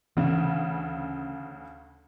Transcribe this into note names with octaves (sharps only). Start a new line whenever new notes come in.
D2 C#3 E3